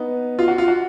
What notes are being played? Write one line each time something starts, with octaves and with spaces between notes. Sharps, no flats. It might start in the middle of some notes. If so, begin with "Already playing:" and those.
Already playing: B3 D#4
F4
F#4
F4
F#4